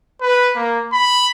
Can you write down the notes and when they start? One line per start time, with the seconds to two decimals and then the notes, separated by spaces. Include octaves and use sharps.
0.21 B4
0.55 A#3
0.93 B5